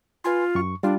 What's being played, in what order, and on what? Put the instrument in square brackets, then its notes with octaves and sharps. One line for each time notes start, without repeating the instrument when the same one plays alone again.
[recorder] F4 [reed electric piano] B4 G#5 C6
[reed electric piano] F#2 C#6
[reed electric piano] G3 F4 [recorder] D4